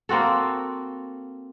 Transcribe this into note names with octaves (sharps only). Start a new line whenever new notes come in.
A#3 C4 F#4 A4